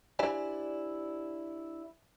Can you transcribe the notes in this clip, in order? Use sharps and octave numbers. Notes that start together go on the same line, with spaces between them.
D4 E4 G4 C5 D5 G#5